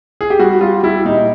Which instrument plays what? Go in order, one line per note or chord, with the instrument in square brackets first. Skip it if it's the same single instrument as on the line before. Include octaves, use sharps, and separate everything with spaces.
[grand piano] G#4
G4
G3 F#4
G3 F4
G3 E4
A#2 D#4